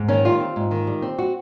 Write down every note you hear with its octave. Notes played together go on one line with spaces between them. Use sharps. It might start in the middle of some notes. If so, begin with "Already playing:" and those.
Already playing: G#2
D#3 C#4
G3 F4
C4
G#2
D#3
G3
C4
F#4